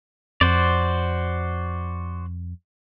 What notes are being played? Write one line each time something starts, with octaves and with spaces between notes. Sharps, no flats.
F2 F#4 C5 D5